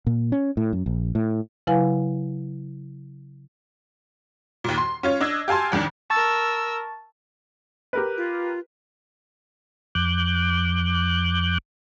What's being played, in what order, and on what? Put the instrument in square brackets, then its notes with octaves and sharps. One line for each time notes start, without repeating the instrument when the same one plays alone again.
[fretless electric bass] A#2
C#4
A2
F#2
A#1
A2
[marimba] C#3 F#3 E4 B4 F5 G#5
[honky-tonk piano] D#2 A#2
C6
C#4 F4 C#5
D4 D#5 E6 G#6
G4 F5 G#5 A5 C6
A1 F2 D#3 D4
[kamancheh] A#4 E6 [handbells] A5 C#6 A6
[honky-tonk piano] G4 A#4 B4
[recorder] F4
[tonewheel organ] F2 D6 F#6 G6